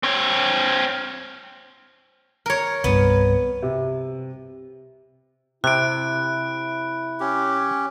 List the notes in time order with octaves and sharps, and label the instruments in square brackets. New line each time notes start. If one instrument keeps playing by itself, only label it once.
[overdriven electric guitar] C4 C#5
[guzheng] A#4 C#5
[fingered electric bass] C2 G2 [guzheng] B3
[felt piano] C3
[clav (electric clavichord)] C3 [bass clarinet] E4 [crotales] F#6 D7
[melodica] C#4 G4